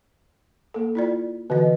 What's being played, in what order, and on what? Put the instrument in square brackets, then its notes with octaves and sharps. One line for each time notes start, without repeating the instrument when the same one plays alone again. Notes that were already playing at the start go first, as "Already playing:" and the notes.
[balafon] A#3 A4
E4 F4 D5
[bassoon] B2 [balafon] D3 E3 D#5